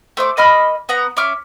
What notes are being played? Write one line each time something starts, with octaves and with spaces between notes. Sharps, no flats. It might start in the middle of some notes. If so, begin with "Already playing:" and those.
A3 C5 E5 D6
A#3 D#5 B5 F6
B3 F#5 A#5
C#4 E5 D6 F6